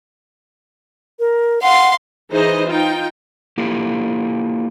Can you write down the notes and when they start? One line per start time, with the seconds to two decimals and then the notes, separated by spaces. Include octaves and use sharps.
1.20 A#4
1.62 F5 F#5 C6
2.30 E3 D#4 G#4 C5 D#5
2.66 D#4 F4 G5
3.58 A#3 E4 F4 G4 A4